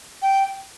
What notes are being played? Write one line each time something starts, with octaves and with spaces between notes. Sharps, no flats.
G5